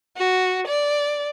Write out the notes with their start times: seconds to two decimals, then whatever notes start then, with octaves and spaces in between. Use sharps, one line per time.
0.17 F#4
0.67 D5